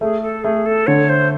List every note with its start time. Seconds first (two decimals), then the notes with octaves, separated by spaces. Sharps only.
0.01 A3 G#4
0.22 A4
0.44 A3 G#4
0.66 A4
0.87 D3 C#5
1.09 C5